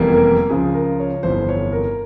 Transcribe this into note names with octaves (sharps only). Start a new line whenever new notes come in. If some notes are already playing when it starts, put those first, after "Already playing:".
Already playing: F1 E2 E3 G3 A#3
A#4
C#2 C#3 F3 G#4
A#4
C#5
G1 F2 C3 E3 C5
C#5
A#4